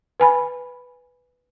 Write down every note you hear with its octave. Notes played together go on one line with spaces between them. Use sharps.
B4 G#5 B5